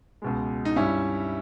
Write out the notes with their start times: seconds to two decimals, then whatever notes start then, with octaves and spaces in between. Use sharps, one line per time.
0.22 C#2 B2 G#3
0.65 D#4
0.76 G2 G3 C#4 E4